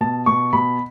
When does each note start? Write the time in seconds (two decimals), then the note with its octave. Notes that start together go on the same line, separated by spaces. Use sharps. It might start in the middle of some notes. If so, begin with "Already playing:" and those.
0.01 B2 A5
0.26 B2 C#6
0.53 B2 B5